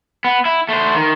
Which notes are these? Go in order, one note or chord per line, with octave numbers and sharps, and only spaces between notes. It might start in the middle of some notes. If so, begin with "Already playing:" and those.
B3
E4
A3 C5
D#3